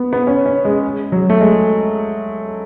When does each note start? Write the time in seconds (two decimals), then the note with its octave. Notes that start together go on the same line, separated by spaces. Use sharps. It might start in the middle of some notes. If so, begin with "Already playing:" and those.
Already playing: B3
0.13 B3
0.27 C#4
0.46 C#4
0.65 G#3
1.12 F#3
1.30 A3
1.41 G#3